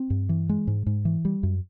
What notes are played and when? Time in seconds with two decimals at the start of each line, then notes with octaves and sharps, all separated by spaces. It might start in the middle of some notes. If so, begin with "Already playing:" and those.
Already playing: C4
0.10 G2
0.29 E3
0.49 G#3
0.67 G#2
0.86 G#2
1.05 E3
1.25 G3
1.43 F#2